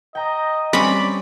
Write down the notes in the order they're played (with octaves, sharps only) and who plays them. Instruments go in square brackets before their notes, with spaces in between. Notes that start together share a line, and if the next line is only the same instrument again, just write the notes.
[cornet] D#5 [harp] G5 A#5
[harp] G3 [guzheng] C4 C#4 [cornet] D5 [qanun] B5